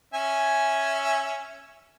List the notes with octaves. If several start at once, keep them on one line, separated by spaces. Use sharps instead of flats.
C#4 E5 G#5